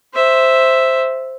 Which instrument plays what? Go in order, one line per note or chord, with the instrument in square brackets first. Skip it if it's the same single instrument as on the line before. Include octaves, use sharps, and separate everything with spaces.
[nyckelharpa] C5 E5